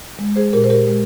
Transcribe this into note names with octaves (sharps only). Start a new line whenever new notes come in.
G#3
G#4 C5
A#2 G4 A#4
C5
G4 A#4
G#3